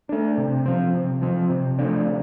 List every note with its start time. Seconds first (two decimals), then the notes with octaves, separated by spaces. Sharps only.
0.09 A3 D4
0.38 C3
0.66 F3 C4
0.93 C3
1.22 F3 C4
1.50 C3
1.79 F3 A3 D4
2.07 C3